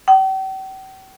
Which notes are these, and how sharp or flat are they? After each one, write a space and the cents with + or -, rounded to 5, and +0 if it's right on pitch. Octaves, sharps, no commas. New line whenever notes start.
G5 -45